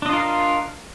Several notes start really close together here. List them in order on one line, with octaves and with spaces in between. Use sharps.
D4 D#5 F4 A#4 F5